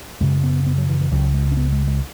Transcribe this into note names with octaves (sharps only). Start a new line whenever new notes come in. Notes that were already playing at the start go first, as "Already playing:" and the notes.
F#2 C#3 G#3
B3
B3
F#3
E3
E3
C#2 C#3 F#3
G#3
C#4
B3
G#3
G#3